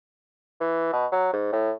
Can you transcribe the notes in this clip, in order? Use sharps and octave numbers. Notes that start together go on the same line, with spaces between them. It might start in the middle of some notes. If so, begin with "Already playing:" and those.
E3
B2
F#3
G#2
A2